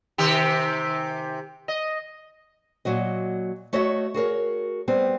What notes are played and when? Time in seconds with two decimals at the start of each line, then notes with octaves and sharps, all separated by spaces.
0.18 C3 D#3 G4
1.68 D#5
2.85 A#2 F#3 F#4 D#5
3.73 A3 F#4 C#5 D#5 E5
4.14 F#4 G#4 A#4 C#5
4.88 G3 B3 C4